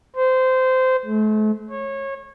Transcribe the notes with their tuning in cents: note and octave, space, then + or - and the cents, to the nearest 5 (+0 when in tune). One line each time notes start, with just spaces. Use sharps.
C5 -20
A3 -40
C#5 -25